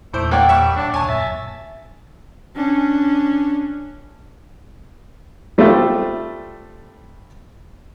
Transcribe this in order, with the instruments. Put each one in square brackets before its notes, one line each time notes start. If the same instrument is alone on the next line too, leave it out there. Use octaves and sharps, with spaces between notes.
[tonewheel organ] E2 A#2 D6 [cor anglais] A3 [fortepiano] E4 C5
[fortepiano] A#3 C#5 D5 [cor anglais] F#5 [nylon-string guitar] G5
[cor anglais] G3 [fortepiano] E5 C#6
[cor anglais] D4 [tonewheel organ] C#5 F#5 A5
[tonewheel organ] D#2 A#2 D#6 [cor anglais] C#5 [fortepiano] G#5 A5
[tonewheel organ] F#2 A#2 A6 [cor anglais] E5
[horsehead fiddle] C#4 D4
[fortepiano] G3 A3 C4 F4 E5